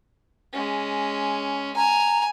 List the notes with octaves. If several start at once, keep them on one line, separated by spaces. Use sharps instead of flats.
G#3 C#4
G#5 A#5